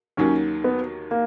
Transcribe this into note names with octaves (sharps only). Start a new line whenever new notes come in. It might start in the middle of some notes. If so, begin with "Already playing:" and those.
D#2 D#3 F#3 A#3 C#4
B3
A#3